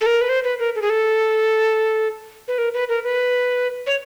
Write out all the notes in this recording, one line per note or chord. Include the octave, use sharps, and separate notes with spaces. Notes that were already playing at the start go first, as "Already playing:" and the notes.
A4
A#4
B4
C5
B4
A#4
A4
G#4
A4
B4
A#4
B4
A#4
B4
C#5